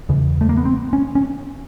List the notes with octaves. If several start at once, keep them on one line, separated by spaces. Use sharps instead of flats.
E2 C#3
A3
A#3
B3
C4
C#4
C#4